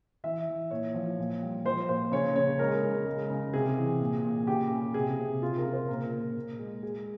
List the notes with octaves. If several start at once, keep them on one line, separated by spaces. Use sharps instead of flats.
E3 E5
E3
A#2 C#5
F3
A#2
G3
F3 C5
A#2 C5
C#3 C#5
C#3 C#5
G#3 A#4
C#3
G#3
C#3
C3 G#4
E3
A#2
A#2
C#3 G4
C#3
C3 G#4
C3
C#3 F4
A#4
C#3
C5
A#2 A#4
A#2
A#2
G#3
G#3 G#4